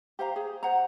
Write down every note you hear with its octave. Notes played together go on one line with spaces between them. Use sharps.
G4 C5 F5 A#5
G#4
C5 F#5 A#5